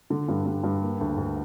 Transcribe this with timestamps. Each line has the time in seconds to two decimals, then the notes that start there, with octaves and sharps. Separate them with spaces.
0.10 D3
0.28 G2
0.46 G2
0.63 G2
0.82 A#3
1.01 D2
1.17 D2